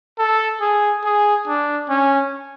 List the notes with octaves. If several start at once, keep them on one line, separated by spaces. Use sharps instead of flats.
A4
G#4
G#4
D4
C#4